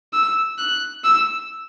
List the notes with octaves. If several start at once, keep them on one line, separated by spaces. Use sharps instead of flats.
E6
F#6
E6